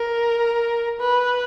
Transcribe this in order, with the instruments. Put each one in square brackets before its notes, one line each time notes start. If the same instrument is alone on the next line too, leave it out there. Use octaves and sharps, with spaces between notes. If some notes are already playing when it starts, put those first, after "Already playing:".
Already playing: [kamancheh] A#4
B4